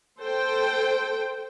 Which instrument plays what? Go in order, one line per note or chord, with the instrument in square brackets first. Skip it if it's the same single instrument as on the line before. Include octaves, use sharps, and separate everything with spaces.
[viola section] A4 C5 G5